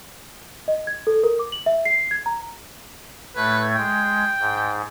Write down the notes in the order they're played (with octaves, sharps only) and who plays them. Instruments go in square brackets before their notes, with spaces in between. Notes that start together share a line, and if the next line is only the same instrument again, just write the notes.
[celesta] D#5
G#6
A4
A#4
D6
F#7
E5
C7
G#6
A#5
[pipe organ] A2 A3 G#6 [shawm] B4
[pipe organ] G#3 [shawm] G5
[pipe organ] G#2